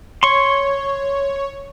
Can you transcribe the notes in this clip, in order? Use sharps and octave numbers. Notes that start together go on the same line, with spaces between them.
C#5 C6 C#6